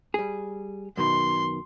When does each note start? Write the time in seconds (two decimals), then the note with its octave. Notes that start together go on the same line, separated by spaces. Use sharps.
0.14 G3 G#4
0.97 F#2 B2 D#3 C6